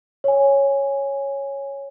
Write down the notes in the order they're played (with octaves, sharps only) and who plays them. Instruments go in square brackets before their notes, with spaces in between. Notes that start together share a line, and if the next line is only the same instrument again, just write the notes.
[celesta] C#5 G#5